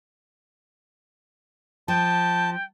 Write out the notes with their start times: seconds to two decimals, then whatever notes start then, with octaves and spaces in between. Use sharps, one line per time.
1.88 F3 G5 A5